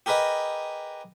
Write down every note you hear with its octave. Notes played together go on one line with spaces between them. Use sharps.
G4 G#4 A#4 B4 D#5